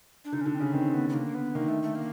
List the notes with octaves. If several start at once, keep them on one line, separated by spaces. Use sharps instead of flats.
D4
D3 D#4
C#4
D3 D4
C4
C#3 C#4
D#3 C4
B3
B3
D3 A#3
B3
D#3 A#3
A3
A3
A#3